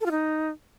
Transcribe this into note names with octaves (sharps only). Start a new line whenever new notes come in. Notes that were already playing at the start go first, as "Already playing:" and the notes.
A4
F4
D#4